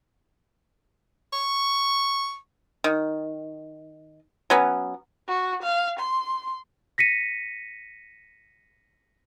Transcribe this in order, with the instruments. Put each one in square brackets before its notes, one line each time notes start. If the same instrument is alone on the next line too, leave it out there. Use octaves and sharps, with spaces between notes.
[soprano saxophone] C#6
[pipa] D#3
F#3 B3 C#4
[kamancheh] F#4
F5
C6
[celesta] A#6 B6 C#7 D#7